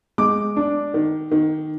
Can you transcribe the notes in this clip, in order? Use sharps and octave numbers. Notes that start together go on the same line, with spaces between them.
G#3 D6
D4
D#3
D#3